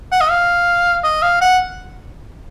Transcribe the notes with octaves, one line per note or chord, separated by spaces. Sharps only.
F#5
D#5
F5
D#5
F5
F#5